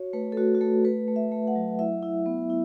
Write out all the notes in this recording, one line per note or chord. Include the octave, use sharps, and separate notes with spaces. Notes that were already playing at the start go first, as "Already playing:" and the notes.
Already playing: F#4 C#5
A3 B4
A4
A3 F#4
F#4
A3 A4
A3 B4
A3
E5
A3
F#5
F#3
E4 E5
E4
B3
E4